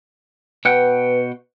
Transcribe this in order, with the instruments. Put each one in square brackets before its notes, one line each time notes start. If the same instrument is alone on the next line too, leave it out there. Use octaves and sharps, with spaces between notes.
[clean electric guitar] B2 F#5 G5 [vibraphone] B4